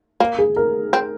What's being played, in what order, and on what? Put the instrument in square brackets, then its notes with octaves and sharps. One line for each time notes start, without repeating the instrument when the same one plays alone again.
[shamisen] A#3
[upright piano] G#4
A#4
[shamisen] C4